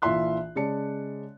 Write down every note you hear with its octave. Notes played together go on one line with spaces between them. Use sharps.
A#1 E3 F4 E5 C6 F#6
C#3 G#3 D5 A5 C#7